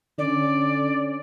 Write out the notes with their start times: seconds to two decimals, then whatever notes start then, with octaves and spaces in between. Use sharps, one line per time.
0.18 D3 C#4 D5